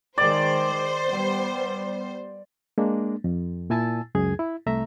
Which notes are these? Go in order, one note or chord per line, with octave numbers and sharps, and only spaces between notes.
D#3 G#3 C5 D5
G3 B3
G#3 A#3 D4
F2
A#2 E4 G#5 A5 E6 A6
C#2 F#2 G#4 G#6
E4
C2 A3 E5 A#5